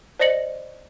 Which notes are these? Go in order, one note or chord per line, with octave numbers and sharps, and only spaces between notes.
C5 D5 D#5 A#6 C#7 F#7